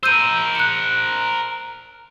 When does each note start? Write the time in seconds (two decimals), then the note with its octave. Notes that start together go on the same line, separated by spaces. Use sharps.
0.03 A#4 C5 E6 G6 D#7
0.55 F#6 C#7